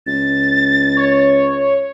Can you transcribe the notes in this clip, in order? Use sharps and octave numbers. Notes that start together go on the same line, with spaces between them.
C#2 A6
C#5